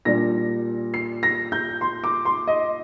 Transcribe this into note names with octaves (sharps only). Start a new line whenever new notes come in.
A#2 G3 D4 A#6
C7
A#6
G6
C6
D6
C6
D#5